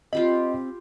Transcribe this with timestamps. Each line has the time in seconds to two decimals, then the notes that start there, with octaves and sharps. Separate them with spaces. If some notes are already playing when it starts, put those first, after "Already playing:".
0.13 C4 F4 G4 D#5 B5